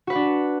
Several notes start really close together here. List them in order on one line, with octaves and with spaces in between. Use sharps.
F#4 B4 F#5 D4